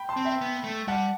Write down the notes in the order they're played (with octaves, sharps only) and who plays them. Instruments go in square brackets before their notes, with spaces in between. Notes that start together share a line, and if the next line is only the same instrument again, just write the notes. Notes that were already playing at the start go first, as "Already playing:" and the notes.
Already playing: [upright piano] G5 B5
A5 C6
[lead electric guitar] C4
[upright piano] E5 G5
[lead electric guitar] B3
A3
[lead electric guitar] G3 [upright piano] F#5 A5